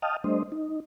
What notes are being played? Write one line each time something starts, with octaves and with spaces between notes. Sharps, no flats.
D#5 F5 G5 A5 D#6 F6
G3 A3 D4 C5 D#5
D#4